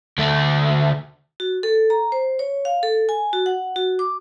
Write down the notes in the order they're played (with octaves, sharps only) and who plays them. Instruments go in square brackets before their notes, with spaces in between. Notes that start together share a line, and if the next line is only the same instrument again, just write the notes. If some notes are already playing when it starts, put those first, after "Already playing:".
[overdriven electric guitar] D2 A3
[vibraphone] F#4
A4
A#5
C5
C#5
F5
A4
G#5
F#4
F#5
F#4
D6